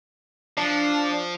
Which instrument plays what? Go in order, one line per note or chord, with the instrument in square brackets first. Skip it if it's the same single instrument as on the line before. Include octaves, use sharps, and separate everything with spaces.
[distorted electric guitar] F3 [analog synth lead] D4